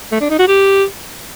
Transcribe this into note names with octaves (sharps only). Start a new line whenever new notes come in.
A3
D4
D#4
F#4
G4